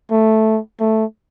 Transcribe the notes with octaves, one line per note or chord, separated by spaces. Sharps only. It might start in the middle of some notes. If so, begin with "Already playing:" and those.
A3
A3